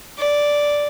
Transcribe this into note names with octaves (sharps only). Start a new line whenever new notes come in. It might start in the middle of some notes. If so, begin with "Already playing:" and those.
D5